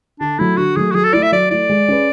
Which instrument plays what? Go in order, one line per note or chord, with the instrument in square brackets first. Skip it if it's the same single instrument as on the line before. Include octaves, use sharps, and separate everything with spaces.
[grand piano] D3 [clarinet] D4
[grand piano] F#3 A3 [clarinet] E4
[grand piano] D3 [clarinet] F#4
[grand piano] F#3 A3 [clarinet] G#4
[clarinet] F#4
[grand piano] F#3 [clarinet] G#4
[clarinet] A4
[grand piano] A3 E4 [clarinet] D5
[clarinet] E5
[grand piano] F#3 [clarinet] D5
[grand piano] A3 E4 [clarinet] D5
[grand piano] G#3
C#4 G#4 B4